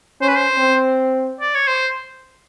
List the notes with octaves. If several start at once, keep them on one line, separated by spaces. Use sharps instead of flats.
C#4 C5
B4
C5
C4
D5
C#5
C5